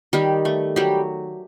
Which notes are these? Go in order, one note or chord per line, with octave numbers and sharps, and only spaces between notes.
D#3 G3 G4
A3
F#3 G3 G4